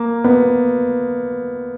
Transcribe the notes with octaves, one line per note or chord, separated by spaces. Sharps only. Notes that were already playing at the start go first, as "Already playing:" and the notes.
Already playing: A#3
B3